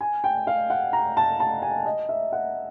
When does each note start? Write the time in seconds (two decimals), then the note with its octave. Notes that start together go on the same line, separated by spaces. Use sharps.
0.01 G#5
0.24 G5
0.47 F5
0.70 F#5
0.93 A#5
1.17 A5
1.40 A5
1.62 G#5
1.86 D#5
2.09 E5
2.32 F#5